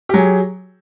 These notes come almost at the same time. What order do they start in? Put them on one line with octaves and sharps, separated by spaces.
G4 F#3 G#4